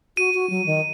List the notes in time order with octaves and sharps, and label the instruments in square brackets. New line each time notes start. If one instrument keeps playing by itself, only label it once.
[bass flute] F#4 [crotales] D#7
[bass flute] F#4
F#3
D#3